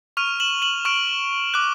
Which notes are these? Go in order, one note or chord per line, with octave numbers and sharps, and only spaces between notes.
C#6 F6 D#7 F7
E7 F#7
E7 F#7
C#6 F6 D7 E7
D6 F#6